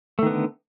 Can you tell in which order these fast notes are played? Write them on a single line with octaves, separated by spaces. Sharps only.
A3 D#3 B3 D3